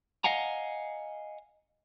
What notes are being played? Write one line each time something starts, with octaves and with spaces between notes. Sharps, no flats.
D#5 F5 F#5 G#5 A#5